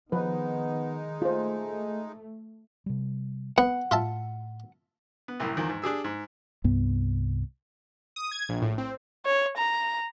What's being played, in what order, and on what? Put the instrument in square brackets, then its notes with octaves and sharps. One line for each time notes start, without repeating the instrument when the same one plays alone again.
[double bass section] D#3 [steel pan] F3 B4 [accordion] G#3 D#4 [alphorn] B3
[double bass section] A3 [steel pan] F4 C5 [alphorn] G#4
[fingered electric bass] C3 G3
[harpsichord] B3 [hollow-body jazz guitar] F#5
[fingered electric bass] A2 [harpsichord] F4 E5 A5
[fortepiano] B3
C2 F#2 A2
E2 D#3 F3
G#2
D4 G4 G#4 E6
G#2
[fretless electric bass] C2 G2 B3
[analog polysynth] D#6
G#6
A#1
A2
C4
[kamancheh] C#5
A#5